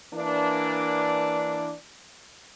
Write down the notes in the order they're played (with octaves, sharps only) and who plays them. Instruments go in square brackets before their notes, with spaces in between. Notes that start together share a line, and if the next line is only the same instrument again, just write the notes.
[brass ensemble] E3 A#3 D4